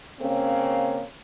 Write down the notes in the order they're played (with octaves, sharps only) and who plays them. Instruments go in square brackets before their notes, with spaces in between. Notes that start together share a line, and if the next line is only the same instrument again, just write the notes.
[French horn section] C#3 A#3 C4 C#4